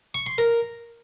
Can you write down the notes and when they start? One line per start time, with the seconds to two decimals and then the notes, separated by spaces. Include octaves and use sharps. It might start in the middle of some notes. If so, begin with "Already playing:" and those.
0.14 C#6
0.26 C6
0.38 A#4